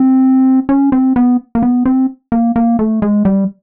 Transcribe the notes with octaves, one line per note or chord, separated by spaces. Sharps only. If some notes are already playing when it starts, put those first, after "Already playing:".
Already playing: C4
C#4
C4
B3
A#3
B3
C4
A#3
A#3
A3
G#3
G3